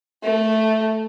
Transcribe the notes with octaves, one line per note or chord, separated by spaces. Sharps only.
A3